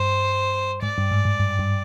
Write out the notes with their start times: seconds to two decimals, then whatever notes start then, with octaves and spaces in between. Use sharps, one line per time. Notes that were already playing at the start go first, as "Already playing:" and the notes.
Already playing: G2 C5
0.83 G#2 D5
0.98 G2
1.11 G#2
1.25 G#2
1.40 G2
1.59 G2